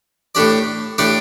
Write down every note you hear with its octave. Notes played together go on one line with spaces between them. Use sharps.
A2 A3 D4 G4 D5
A2 A3 D4 G4 D5